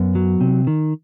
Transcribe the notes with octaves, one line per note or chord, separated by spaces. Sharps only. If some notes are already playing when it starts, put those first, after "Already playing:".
Already playing: F#2 B3
F#3
C3
D#3